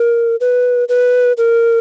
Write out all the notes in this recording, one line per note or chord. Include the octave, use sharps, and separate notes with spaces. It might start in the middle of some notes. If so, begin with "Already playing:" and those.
Already playing: A#4
B4
B4
A#4